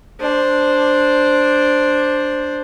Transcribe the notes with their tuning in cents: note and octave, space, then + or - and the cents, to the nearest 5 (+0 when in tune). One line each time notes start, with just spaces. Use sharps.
D4 +0 C5 +0